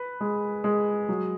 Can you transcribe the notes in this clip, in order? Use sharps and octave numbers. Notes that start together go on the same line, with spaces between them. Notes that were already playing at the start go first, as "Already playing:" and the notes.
Already playing: B4
G#3
G#3
F#3